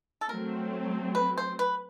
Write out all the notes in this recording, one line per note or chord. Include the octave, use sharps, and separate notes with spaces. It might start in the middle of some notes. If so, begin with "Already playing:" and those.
A4
F#3 A3 C4 A#4
B4
C5
B4